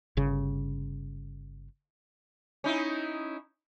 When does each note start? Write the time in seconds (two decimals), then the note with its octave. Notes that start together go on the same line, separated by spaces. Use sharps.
0.17 G1 C#3
2.64 C#4 D#4 E4